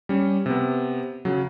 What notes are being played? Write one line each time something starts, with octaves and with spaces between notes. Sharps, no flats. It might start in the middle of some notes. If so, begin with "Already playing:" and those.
G3 C#4
C3 B3
C#3 F#3